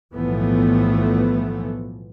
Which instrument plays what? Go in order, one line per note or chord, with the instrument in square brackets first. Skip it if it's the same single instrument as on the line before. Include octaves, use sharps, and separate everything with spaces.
[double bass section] B1 A2 E3 F3 A3 B3